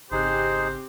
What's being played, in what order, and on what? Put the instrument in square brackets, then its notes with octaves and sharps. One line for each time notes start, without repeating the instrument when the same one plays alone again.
[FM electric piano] G#1 C#3 F#6 [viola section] C4 G4 [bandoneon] D#4 G#4 [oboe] C5